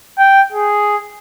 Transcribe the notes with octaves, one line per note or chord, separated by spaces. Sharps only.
G5
G#4